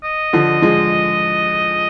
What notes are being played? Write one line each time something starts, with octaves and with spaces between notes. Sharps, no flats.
D#5
D3 F3
F3 G#3